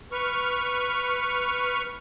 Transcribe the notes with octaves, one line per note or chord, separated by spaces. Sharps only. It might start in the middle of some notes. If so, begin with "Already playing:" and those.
B4 C#6 F6